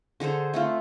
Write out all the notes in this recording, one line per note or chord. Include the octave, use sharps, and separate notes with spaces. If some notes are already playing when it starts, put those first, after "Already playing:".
D3 G#4 A4 C5
A3 C4 F4